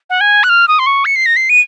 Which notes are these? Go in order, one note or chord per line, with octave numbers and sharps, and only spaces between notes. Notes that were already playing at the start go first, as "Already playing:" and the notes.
F#5
G#5
F#6
F6
D#6
C6
C#6
C#7
C7
A#6
C7
D#7